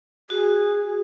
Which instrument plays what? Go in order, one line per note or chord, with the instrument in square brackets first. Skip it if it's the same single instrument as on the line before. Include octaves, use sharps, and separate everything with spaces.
[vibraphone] F#4 [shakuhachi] G#4